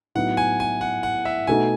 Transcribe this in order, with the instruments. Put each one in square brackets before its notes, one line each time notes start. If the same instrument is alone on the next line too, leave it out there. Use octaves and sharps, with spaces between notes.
[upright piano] A2 F#3 B3 D#4 [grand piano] F#5
[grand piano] G#5
G#5
F#5
F#5
E5
[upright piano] B2 A3 D#4 [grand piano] G#5